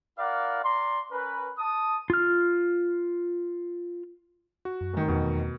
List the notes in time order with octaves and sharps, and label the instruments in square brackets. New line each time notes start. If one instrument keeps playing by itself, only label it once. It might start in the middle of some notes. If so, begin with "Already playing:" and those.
[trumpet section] E4 A#4 D5 F5 F#5
D5 A#5 C6
C#4 A#4 B4
A5 D#6
[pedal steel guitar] F4 F6
[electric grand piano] F#4
[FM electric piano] F#2
[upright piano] F1 D#3
[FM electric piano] E2 [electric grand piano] B2